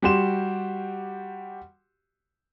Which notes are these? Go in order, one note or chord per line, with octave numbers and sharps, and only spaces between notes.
G3 F#4 G4 C6 E7